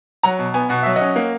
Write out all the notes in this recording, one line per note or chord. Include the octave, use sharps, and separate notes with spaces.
F#3 F#5 A#5
B2
B3 G#5
B2 F#5
F#3 E5
D#5 F#5
C#4
A#3